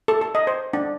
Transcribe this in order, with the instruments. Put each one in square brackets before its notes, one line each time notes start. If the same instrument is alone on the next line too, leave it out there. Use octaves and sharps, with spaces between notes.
[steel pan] A4
A4
D#5
C5
D4